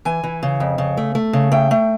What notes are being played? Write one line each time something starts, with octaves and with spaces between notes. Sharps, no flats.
E3 G#5
E3
C#3
F2
C#3
A3
A3
C#3
A3 G5
A3